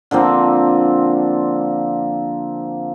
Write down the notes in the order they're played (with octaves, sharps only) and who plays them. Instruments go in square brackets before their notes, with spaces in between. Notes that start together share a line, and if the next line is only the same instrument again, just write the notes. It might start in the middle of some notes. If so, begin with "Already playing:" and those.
[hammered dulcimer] D3 F3 A#3 C4